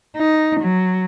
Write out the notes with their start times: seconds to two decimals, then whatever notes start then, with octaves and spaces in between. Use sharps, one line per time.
0.17 D#4
0.60 F#3